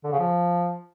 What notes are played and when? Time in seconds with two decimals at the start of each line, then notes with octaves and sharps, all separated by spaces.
0.04 D3
0.12 C#3
0.19 F3